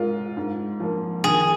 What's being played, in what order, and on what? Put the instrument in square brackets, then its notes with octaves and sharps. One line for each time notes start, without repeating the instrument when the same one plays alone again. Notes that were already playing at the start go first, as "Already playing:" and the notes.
Already playing: [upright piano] G#2 G#3 F4 A#4
G#2
F3 A#3
[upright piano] D#3 [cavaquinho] G#4